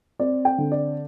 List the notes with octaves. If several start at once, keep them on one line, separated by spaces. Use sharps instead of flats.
C4 D5
G5
D3
D5